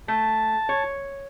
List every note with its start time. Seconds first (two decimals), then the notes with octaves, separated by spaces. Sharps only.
0.08 A3 A5
0.69 C#5